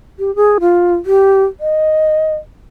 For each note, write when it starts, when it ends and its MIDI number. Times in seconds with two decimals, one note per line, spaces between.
0.19 0.34 67
0.36 0.58 68
0.60 0.94 65
1.06 1.45 67
1.60 2.35 75